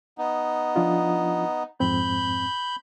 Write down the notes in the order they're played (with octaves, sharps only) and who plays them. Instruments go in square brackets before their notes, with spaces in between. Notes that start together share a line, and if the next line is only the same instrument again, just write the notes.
[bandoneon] B3 D#4
[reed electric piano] F3 D4 F4
[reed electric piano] F2 G#2 C4 [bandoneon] B5 G6